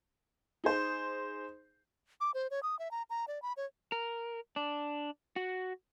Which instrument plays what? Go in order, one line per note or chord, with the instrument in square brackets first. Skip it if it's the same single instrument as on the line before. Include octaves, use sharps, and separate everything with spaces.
[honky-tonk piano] D#4 G#4 C5
[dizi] D6
C5
C#5
D#6
E5
A#5
A#5
D5
B5
C#5
[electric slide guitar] A#4
D4
F#4